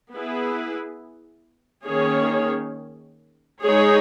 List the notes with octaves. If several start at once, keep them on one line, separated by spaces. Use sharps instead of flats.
B3 E4 G#4 B4
D#3 A#3 C#4 G#4 C#5
G#3 D#4 G#4 C#5